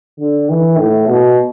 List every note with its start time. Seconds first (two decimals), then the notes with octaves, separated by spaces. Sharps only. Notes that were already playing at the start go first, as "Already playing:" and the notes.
0.20 D3
0.50 E3
0.77 A2
1.08 B2